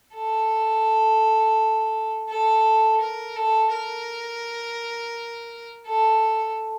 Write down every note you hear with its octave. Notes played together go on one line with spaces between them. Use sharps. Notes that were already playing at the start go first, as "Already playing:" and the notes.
A4
A4
A#4
A4
A#4
A4